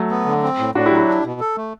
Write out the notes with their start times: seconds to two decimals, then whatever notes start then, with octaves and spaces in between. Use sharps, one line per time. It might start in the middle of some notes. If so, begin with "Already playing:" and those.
Already playing: F#3 A3
0.10 B3
0.26 D3
0.43 C4
0.59 A2
0.75 A2 D4 F#4
0.86 E4 G4
0.91 F#3
0.97 E4 G4
1.08 D4
1.24 B2
1.40 A4
1.57 A3